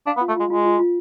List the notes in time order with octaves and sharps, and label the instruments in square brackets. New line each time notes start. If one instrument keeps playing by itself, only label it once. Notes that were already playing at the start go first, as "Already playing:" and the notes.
[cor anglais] D4 [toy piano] F5
[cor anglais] B3
[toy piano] F4
[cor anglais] A3
[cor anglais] G#3 [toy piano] F4
[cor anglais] G#3 [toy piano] F4
[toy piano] F4
F4